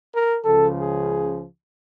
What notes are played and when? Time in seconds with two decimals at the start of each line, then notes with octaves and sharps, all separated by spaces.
0.13 A#4
0.44 C#2 C#3 F3 A4
0.76 G#4